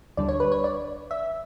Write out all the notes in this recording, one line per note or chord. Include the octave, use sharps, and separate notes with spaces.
D2 D3 G3 D4 D5
C#5
B4
C#5
D5
E5